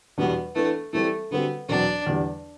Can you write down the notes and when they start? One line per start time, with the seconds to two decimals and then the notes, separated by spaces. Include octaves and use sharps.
0.18 E2 B2 G3 B3 D4 F#4
0.55 E3 A3 B3 D4
0.93 E3 G3 A3 C4
1.31 D3 G3 B3 C4 F#4
1.69 E2 B2 F#3 C4 D4
2.07 E2 D3 G3